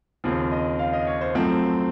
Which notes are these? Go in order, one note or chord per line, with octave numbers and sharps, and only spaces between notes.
D#2 C#3 F3 C4
D#5
F5
D#5
C#5
C5
F#2 F3 A3 C4